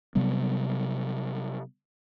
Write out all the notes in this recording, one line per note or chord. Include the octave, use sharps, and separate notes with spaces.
C3 F#3 G3 B3